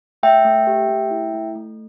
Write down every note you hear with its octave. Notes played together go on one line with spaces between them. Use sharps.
A3 E5 G5
A3
G4
A3
E4
A3
A3